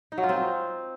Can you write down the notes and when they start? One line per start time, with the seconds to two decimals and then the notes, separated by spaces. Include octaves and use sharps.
0.12 D#4
0.18 F#3
0.23 F4
0.29 C4